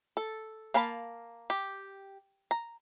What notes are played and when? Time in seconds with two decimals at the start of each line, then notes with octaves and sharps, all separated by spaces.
0.17 A4
0.74 A#3 F5 A5 B5
1.50 G4
2.51 A#5